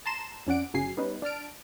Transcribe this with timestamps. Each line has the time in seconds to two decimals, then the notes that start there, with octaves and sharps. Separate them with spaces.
0.06 A5 A#5 C6 E7
0.47 F2 C#4 D5 F#5 D7
0.74 G1 C#3 F#3 G#5 C7
0.97 G3 B3 C#4 D#4 B4
1.22 D4 A5 F6 D7